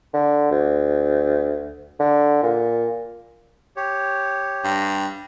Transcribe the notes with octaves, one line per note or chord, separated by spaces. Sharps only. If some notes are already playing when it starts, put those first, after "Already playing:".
D3
D2
D3
A#2
G4 C#5
G2